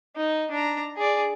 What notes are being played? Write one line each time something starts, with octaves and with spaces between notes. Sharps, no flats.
D#4
D4 A#5
G#4 D5